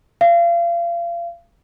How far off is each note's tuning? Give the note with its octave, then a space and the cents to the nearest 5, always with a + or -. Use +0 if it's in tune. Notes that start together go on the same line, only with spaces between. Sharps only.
F5 -35